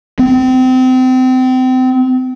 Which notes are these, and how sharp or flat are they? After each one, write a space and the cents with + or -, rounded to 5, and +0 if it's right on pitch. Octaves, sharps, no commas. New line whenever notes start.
C4 -30